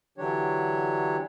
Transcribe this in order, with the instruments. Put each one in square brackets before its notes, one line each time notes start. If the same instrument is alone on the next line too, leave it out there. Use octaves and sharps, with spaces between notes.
[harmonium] D3 E3 F#3 D4 G4 C#5